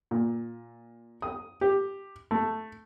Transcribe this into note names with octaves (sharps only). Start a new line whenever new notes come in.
A#2
D#6
G4
A3